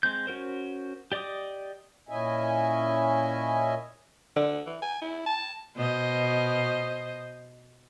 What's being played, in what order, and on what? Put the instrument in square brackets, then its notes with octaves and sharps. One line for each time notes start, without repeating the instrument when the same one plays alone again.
[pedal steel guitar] G#3 C4 G6
C#4 F#4 A#4 C5
G4 D5 D#5 D6 D#6
[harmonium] A#2 C#4 E4 D#5 E5 G#5
[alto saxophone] D3
E3
G#5
E4
A5
[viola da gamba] B2 C5 D#5